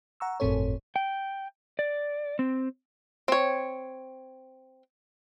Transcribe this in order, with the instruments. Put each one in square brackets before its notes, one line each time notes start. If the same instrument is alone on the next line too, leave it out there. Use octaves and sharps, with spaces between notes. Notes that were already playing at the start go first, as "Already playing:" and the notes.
[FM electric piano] F#5 A#5 C#6 E6
G1 F2 A2 C4 A4 C#5
[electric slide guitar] G5
D5
C4
[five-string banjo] C4 C#5